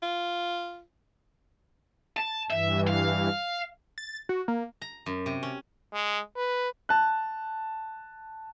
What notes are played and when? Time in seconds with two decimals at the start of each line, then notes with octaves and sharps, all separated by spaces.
0.02 F4
2.17 A5
2.50 G2 E3 E5
2.87 F5
3.98 A6
4.29 F#4
4.48 A#3
4.82 A#5
5.06 F#2
5.26 C3
5.43 C#4
5.94 G#3
6.36 B4
6.89 A5 F#6